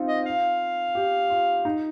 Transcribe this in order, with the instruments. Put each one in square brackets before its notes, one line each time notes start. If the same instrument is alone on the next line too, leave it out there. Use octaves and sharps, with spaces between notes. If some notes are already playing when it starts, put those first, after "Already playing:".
Already playing: [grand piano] C4 D#4 F4
[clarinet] D#5
F5
[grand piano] G4
F4
D#4